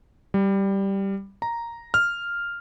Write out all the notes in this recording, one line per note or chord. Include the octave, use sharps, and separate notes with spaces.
G3
A#5
F6